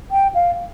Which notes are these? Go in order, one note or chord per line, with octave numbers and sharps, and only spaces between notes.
G5
F5